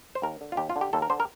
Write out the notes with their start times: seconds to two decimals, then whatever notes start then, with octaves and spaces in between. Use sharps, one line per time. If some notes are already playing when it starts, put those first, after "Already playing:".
0.15 C5
0.22 D#2 A#4
0.41 D3
0.52 F4
0.57 D#2 G4
0.70 F4
0.76 D3
0.81 G4
0.93 D#2 A4
1.02 A#4
1.10 D3 C5
1.20 A#4